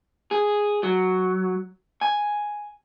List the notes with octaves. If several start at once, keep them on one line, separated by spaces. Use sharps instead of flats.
G#4
F#3
G#5